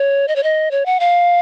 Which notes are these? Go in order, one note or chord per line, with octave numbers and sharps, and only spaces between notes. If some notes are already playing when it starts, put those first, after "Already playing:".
Already playing: C#5
D#5
C#5
D#5
C#5
F#5
F5